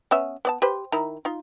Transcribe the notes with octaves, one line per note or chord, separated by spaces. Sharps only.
B3 C#4 E5
B3 D5 A5
G4 B4 C5
D#3 E4 A#5
D#4 F4